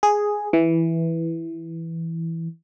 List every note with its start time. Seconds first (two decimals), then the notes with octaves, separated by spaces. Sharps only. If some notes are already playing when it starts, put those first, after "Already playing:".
0.03 G#4
0.53 E3